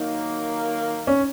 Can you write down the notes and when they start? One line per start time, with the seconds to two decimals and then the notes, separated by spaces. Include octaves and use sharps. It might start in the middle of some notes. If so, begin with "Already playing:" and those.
Already playing: D#3 F#3 A#3 D#4
1.07 C#4